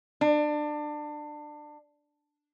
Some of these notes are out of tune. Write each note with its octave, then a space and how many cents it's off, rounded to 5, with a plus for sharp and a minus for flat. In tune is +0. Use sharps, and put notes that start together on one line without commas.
D4 +25